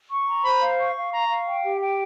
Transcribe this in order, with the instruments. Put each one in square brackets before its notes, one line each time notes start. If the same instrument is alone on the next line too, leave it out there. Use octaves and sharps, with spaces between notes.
[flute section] C#6
A#5
[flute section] C5 [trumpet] B5
[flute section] F5
C#6
F5
[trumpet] A#5 [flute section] C#6
[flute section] F5
G5
G4
G5